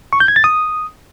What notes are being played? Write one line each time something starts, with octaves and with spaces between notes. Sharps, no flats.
C#6
G6
G#6
A6
D#6